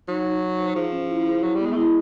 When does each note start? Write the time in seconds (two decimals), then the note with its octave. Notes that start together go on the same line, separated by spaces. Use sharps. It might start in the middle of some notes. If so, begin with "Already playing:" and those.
0.08 F#3 D#4
0.25 D#4
0.42 D#4
0.58 C5
0.75 F3 G#4
0.92 C#4
1.09 E4
1.26 G#4
1.43 F#3 E4
1.55 G3 B3
1.65 G#3
1.72 A3
1.76 G#3 E4